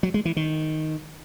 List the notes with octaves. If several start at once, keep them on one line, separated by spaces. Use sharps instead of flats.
F#3
G#3
E3
D#3